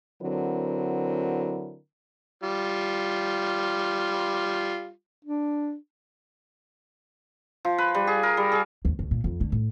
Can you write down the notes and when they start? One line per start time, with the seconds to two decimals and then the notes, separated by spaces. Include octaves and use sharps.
0.22 D3 F#3 C4 E4 A#4
2.43 G3 F4
5.25 D4
7.65 F3
7.78 B4
7.95 G3
8.07 G#4
8.23 A#4
8.37 G3
8.52 G#4
8.85 D#2
8.99 D2
9.11 A#2
9.24 F2
9.41 D3
9.52 A2